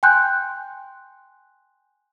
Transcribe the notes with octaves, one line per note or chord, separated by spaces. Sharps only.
G5 G#5 C6 F#6 G6